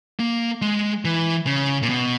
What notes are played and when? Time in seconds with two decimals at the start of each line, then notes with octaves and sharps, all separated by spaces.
0.19 A#3
0.62 G#3
1.05 E3
1.47 C#3
1.82 A#2
1.90 B2